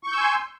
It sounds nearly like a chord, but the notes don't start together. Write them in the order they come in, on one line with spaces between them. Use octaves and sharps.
C#6 G6 E6 G#5 C6